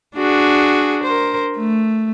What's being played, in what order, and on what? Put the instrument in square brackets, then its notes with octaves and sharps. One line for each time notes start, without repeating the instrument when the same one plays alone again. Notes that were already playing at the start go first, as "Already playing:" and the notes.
[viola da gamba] D4 F#4 G#4
A#4 C5
A3